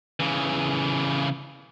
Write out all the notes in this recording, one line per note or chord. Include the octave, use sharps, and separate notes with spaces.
C#3 E3